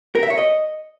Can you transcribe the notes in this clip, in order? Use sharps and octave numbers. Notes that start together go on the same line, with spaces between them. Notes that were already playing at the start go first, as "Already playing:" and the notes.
A#4
E5
C#5
D#5